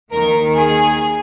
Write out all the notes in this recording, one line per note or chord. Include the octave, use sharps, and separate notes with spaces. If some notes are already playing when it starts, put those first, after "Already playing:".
D#2 D#3 A#4
G#4